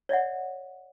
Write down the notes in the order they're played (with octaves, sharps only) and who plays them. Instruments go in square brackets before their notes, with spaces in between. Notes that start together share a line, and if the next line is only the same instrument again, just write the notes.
[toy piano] C#5 D5 E5 F#5